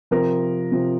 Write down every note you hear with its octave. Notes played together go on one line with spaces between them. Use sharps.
C3 F3 A#4
C3 F3